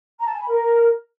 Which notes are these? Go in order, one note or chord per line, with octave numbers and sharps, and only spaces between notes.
A#5
A5
G#5
B5
A#4